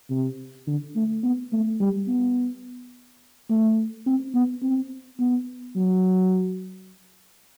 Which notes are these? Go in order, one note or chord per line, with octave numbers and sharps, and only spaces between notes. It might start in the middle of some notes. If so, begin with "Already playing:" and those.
C3
D3
A3
B3
A3
G3
B3
A3
C4
B3
C4
B3
F#3